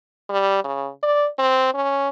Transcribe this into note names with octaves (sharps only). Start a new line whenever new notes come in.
G3
C#3
D5
C4
C#4